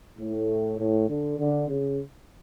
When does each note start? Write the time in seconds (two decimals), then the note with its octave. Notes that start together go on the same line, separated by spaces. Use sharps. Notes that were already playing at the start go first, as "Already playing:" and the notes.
0.19 A2
0.79 A2
1.09 D3
1.39 D3
1.69 C#3